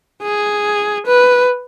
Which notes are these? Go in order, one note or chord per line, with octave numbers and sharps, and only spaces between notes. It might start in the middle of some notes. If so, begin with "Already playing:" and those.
G#4
B4